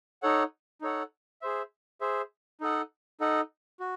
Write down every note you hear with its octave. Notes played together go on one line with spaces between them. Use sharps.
D#4 A4 C#5 F#5
D#4 A4 C#5 F#5
G#4 C5 E5
G#4 C5 E5
D#4 A4 D#5 F#5
D#4 A4 D#5 F#5
F#4